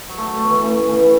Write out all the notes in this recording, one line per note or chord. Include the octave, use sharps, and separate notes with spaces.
F#3
A3
F#3
A3
B3
E3 A3
A3 C#4
E3 A3
E3